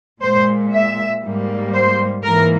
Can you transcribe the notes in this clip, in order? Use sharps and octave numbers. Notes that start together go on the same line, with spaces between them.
A#2 G#3 C5
E5
G#2 G3 A#3
C5
G#2 E3 A#3 A#4